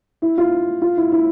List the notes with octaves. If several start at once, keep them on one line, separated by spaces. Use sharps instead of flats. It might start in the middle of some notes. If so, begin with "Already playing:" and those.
E4
F4
F4
E4
E4